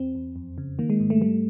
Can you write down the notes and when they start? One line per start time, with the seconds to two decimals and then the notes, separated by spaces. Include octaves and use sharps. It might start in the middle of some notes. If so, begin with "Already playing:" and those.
Already playing: E2 C4
0.15 E2
0.36 F2
0.58 C#3
0.79 D#3 A#3
0.90 G#3
1.00 G#2
1.10 A3
1.21 G3 A3